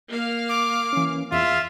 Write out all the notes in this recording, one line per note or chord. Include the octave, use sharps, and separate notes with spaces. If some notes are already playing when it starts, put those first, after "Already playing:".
A#3 F5
D6
E3 C#4
E2 F4 E5